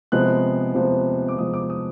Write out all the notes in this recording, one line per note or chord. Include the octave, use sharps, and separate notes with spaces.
C3 F3 G#3 B3 F#6
C3 F3 G#3 B3
D6
C3 F3 G#3 B3 D#6
D6
D#6